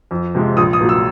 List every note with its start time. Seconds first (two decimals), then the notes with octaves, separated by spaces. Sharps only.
0.11 F2
0.35 C3 F3 G#3
0.57 A#1 D#6
0.73 D#6
0.80 A#2 F#3
0.89 E6